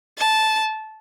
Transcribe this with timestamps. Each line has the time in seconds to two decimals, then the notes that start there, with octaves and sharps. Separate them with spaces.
0.18 A5